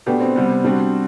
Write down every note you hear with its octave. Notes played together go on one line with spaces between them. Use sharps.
B2 A3 B3 D4 G4
C4
C3 G3 B3
G3 C4 D4 F#4